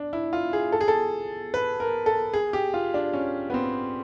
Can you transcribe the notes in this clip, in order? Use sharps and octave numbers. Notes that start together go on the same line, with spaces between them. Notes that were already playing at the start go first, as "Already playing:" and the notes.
Already playing: D4
E4
F4
G#4
A4
G#4
A4
B4
A#4
A4
G#4
G4
F4
D4
C#4
B3
C4